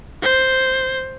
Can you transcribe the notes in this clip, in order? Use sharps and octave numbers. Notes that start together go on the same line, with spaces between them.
C5